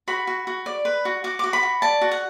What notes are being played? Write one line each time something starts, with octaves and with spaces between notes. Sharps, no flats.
F#4 B5
F#4
F#4
D5
B4
F#4
F#4 D6
F#4 D6
B5
F#4
D5 A5
F#4
F#5